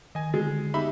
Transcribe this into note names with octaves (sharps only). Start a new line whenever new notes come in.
D#3 D#5 G#5
D3 G#3
B3 D#4 G4 E5 B5 D6